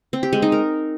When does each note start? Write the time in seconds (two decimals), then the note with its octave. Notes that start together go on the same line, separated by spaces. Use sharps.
0.13 C4
0.23 G4
0.33 G#3
0.42 D#4
0.52 A#4